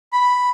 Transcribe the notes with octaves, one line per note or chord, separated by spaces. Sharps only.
B5